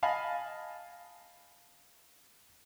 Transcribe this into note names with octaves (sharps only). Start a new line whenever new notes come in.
D#5 F5 G#5 A5 B5